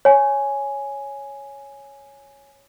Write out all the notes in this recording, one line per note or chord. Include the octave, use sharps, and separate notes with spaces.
C#5 G#5